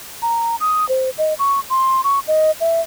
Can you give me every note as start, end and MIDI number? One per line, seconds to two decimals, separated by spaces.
0.22 0.56 82
0.60 0.88 87
0.89 1.10 72
1.18 1.34 75
1.39 1.60 85
1.70 2.01 84
2.04 2.19 85
2.28 2.51 75
2.61 2.81 76